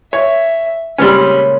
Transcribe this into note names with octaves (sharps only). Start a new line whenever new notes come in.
C#5 E5
A#2 C#3 G3 G#3 C4 C#4 B5